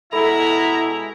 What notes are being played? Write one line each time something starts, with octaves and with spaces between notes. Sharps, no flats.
B2 G#3 E4 A4 A#5 B5